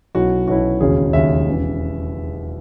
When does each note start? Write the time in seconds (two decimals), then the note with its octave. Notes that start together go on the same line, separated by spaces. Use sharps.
0.15 B1 B2 F#3 C#4 E4 F#4
0.47 B1 B2 F#3 C#4 E4 F#4
0.81 E1 D#2 C#3 F#3 C#4 G#4
1.13 E1 D#2 C#3 F#3 C#4 E5
1.47 E1 E2 C#3 E3